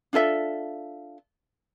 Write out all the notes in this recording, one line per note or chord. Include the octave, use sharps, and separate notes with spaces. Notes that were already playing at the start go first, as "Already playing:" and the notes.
D4 F4 A4 E5